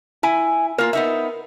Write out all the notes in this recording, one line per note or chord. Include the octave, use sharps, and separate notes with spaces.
E4 G#5
A#3 F4 A#4
B3 D#4 E5